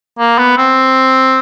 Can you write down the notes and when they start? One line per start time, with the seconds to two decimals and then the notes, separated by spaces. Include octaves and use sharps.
0.19 A#3
0.38 B3
0.58 C4